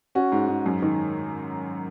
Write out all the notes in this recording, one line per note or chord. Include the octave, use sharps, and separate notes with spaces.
C#4 F#4
G#2
G#2
F#2
D#3